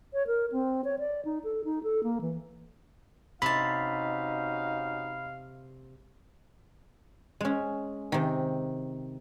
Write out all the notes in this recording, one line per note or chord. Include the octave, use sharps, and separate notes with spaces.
C#5
A#4
C4
C#5
D5
D#4
A4
D#4
A4
A#3
E3
C3 C#4 D#4 F#4 F5 A5 B5
G#3 C#4
C3 D#3